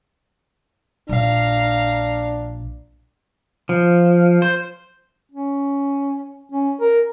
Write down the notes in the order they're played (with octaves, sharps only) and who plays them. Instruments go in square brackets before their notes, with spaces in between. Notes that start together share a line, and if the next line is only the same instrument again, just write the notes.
[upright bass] A#1 A#2 [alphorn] D4 [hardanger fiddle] F5 A#5
[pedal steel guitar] F3
C5
[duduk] C#4
C#4
A#4